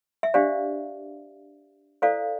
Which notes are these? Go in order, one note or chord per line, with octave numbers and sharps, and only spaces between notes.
E5
D4 G4 C5 D5 F5
E4 A4 C5 D5 F5